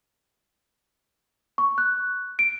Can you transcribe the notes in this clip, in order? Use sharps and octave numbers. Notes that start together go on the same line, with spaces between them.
C#6
F#6
D7